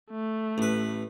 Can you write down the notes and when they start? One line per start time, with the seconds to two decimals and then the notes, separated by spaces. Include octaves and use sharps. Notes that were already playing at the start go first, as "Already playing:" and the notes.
0.11 A3
0.58 A1 B4